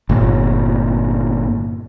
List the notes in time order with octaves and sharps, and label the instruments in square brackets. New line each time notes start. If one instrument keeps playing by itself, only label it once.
[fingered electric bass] G1 A#2